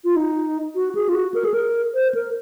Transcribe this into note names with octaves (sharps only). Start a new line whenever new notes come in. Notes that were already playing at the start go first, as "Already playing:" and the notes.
F4
D#4
F#4
G#4
F4
F#4
A#4
G#4
A#4
C5
A#4